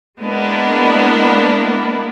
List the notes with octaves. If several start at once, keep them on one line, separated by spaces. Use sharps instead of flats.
G#3 A#3 B3 D4 E4